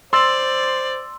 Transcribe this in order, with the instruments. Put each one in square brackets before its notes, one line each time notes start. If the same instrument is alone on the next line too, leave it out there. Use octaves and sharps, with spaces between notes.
[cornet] C5 [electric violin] D5 [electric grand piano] C6 E6 A6